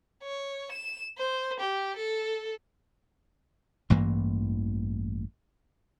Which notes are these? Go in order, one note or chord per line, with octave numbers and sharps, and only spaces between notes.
C#5
E7
C5
G4
A4
A1 G2 E3 A#3